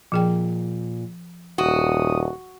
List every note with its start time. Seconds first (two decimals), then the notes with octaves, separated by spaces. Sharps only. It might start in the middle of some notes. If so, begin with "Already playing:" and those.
0.12 A#2 F3 G#4 G5
1.58 D#1 F#4 D#6